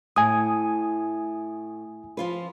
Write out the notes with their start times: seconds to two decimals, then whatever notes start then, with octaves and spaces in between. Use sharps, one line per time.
0.16 A2 G#5 D#6
2.17 F3 F4 B4